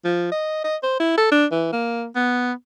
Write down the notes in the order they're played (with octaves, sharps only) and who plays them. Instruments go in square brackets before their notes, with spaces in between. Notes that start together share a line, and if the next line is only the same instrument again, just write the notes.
[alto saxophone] F3
D#5
D#5
C5
E4
A4
D4
E3
A#3
B3